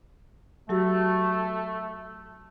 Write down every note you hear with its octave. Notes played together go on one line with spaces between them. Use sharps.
F#3 A3 F#4 G4